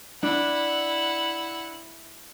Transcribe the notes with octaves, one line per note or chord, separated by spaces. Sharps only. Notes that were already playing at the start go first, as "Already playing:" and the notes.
D4 E4 F#5